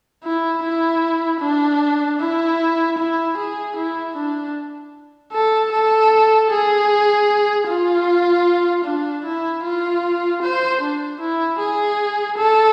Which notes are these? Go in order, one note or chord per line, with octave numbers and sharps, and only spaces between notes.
E4
E4
D4
E4
E4
G#4
E4
D4
A4
A4
G#4
F4
D4
E4
F4
C5
D4
E4
G#4
A4